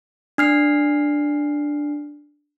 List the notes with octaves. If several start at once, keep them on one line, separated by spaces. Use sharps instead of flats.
D4 F6 C7